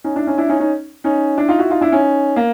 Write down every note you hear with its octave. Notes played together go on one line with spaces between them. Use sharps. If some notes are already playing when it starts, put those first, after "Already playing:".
C#4 D#4
D4 E4
C#4 D#4
D4 E4
C#4 D#4
C#4 D#4
C#4 D#4
D4 E4
D#4 F4
E4 F#4
D#4 F4
D4 E4
C#4 D#4
A#3